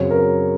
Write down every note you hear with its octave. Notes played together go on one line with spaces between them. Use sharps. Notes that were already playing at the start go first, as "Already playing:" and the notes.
Already playing: F#2 C#3 F#3 C4 C#5
A#4